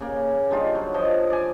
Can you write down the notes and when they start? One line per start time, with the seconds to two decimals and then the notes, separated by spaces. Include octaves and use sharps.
0.01 C#3 A#3
0.50 D3 G3 D#4 F4
0.75 F#3
0.94 F3 C5 D#5
1.30 D5 G#5